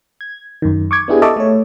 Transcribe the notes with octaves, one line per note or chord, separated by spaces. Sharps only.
G#6
F#2 D#3
C#6 D6 G#6
B3 D4 E4 G4 G#4
A4 D#5 E5 A5 C#6 D6
A3 C#5